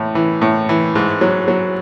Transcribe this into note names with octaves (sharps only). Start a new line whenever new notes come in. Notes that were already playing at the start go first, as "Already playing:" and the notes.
Already playing: A2 E3
E3
A2
E3
G#2
F#3
F#3